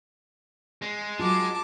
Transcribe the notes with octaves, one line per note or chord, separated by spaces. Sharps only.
G#3
F#3 F4 A5 D6